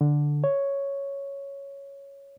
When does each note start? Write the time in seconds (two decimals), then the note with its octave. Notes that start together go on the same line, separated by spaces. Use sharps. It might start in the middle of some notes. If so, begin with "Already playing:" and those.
0.01 D3
0.44 C#5